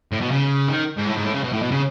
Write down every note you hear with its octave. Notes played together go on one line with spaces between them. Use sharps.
A2
B2
C#3
D#3
G#2
A2
G#2
A2
C#3
B2
A2
B2
C#3